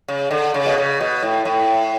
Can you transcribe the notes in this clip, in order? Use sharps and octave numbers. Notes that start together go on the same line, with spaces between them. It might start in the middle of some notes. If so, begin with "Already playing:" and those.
C#3
D3
C#3
B2
C#3
B2
A2
A2